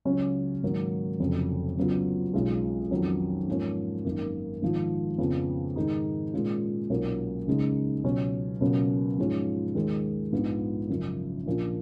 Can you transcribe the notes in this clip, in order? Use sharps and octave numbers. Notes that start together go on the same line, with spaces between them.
C#2 C#3 F#3 C#4
G#2 D#3 F#3 A#3
F1 F2 C#3 F#3
C#2 C#3 F#3 B3 F4
B1 B2 G#3 C#4 F4
F2 D#3 F#3 C#4
G#2 F3 A#3 C#4
G#1 F#2 D#3 A#3
G#1 G#2 F3
F2 C#3 F3 B3
G#2 D#3 G#3 D#4
A#2 G#3 C#4 F4
B1 A#2 F#3 A#3 C#4
C#2 C#3 G#3 D#4
C#2 B2 F#3 C#4
C#2 B2 F#3 A#3 C#4
G#2 F3 G#3 C#4 F4
D#2 D#3 G#3
A#1 G#2 F3 B3 F4
F#1 F#2 F3
A#1 A#2 F3